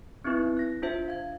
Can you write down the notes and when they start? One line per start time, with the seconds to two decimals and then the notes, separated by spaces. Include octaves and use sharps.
0.24 B3 C4 D#4 E4 B4
0.57 F#6 A#6
0.82 D4 F4 C5 E5
1.08 F5 G#6